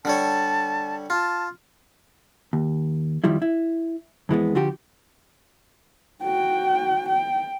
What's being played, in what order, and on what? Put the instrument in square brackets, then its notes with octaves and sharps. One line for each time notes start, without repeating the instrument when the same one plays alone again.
[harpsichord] D3 G3 C#5 [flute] A5
[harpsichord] F4 [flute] A5
[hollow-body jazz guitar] D#2
F2 D#3 F3 G3 E4
E4
F2 E3 G#3 B3
D3 F3 F#4 G4
[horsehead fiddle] F#4 G5
G5